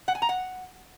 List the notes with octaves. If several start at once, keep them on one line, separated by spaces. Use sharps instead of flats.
F#5
G#5
A#5
F#5